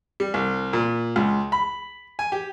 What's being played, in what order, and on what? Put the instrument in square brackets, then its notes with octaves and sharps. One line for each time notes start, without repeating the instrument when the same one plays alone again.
[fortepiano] G3
C2
A#2
C#2
B5
G#5
G4